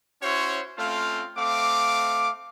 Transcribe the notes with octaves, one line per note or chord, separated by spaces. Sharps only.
C#4 E4 F#4 C5 C#5
A3 C4 C#4 F4 C5 F5
A3 C4 F5 D6